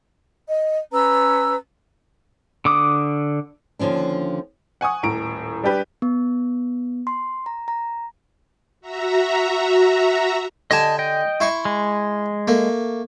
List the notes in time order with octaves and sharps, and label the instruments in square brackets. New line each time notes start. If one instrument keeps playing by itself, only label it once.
[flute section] D#5
C#4 B4 A#5 E6
[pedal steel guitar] D3 D6 D#6
[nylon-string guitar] D#2 D3 F3 C#4 D4
[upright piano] F#5 G#5 C#6 D#6
D#1 A2 A#5 D7
G3 D4 G4 B4
[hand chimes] B3
C6
A#5
A#5
[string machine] F#4 E5 A#5
[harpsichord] D3 G4 G#5 [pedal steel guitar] D#5 A5
[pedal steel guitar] D#5 G5
[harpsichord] E4 C6 C#6
[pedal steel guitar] G#3
[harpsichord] A3 A#3